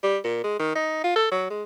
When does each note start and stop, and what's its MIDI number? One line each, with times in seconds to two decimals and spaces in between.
0.03 0.18 55
0.24 0.40 46
0.44 0.58 56
0.59 0.71 51
0.75 0.99 63
1.04 1.15 65
1.16 1.27 69
1.32 1.49 54
1.50 1.63 56